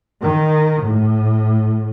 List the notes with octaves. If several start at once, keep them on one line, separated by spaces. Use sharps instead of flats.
D#3
A2